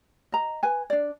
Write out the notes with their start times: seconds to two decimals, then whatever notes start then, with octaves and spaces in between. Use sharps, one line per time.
0.32 D#5 A#5
0.63 B4 G#5
0.90 D4 D5